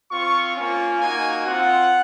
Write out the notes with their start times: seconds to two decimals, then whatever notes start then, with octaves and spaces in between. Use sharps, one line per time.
0.12 C4 F4 C#6
0.56 A#3 C#4 F4
1.01 A#3 D#4 F#4 G#5
1.46 C4 F4 F#5